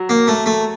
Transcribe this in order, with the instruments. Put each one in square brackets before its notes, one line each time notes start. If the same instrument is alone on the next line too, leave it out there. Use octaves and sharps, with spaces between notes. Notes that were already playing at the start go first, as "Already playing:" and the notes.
Already playing: [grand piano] F#3
[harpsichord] A#3
A3
A3